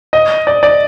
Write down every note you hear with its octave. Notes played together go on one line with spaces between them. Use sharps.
D#5
D5
D5